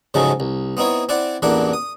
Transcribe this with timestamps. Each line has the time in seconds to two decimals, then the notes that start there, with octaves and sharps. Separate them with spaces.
0.14 G#2 C#3 F3 F#3 G#3 A3
0.40 C2
0.77 B3 C4 D#4 E4 C#5
1.09 C4 E4 D5 F#5
1.42 A1 E2 A#3 D4 E4 F#5
1.73 D#6